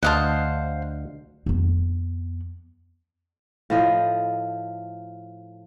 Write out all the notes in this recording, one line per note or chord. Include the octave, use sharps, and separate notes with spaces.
D2 C5 D#5 F5 F#5 A5
F2 B3
A2 F3 D#5